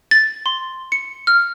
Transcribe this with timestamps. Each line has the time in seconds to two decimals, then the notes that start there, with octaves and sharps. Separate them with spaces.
0.11 A6
0.46 C6
0.92 C#7
1.27 F6